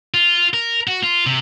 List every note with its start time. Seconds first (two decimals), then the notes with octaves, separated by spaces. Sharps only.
0.14 F4
0.54 A#4
0.87 F#4
1.03 F4
1.26 C3